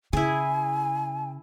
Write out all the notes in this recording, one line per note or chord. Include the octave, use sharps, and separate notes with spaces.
C#3 E4 G#4 G#5